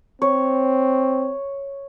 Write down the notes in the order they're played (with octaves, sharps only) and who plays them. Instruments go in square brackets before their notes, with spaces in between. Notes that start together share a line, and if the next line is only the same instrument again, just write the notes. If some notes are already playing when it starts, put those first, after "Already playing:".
[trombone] C4 [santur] C#5